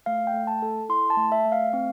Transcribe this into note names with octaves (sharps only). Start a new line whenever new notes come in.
A3 F5
G5
A3
A5
A4
E4 C6
A5
A3
E5
A3
F5
C4